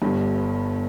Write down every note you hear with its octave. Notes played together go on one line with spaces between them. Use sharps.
G1 G2